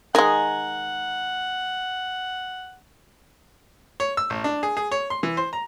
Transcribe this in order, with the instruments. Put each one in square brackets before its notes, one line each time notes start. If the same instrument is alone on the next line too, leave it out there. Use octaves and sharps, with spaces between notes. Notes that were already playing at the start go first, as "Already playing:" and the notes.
[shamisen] D#3 G#3 [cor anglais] F#5 [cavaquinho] G#5 A#5
[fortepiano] C#5
E6
A1
D4
G#4
G#4
C#5
C6
E3
C5
A#5